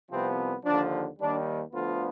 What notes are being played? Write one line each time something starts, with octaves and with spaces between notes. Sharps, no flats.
C2 C3 F3 B3 C4
D#2 D3 F3 D4
D#2 D#3 G3 D4
D2 D3 F3 B3 F4